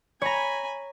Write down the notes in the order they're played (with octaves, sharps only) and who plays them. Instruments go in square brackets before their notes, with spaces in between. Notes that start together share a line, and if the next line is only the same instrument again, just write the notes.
[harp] C#5 A#5 [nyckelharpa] G#5 B5